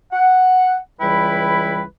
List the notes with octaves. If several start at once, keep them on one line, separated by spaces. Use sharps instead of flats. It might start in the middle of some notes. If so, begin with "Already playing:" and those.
F#5
C#2 E3 G3 E4 B4 G5